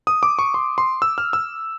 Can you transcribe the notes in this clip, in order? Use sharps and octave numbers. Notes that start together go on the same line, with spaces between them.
D#6
D6
C#6
C6
C6
E6
F6
E6